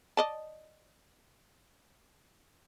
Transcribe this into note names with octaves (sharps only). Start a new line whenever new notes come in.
D5 D#5 A5